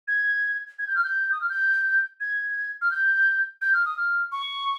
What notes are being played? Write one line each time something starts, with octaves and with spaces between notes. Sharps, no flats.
G#6
G#6
G6
F6
G6
D#6
F6
G6
G#6
F6
G6
G6
F6
D#6
F6
C#6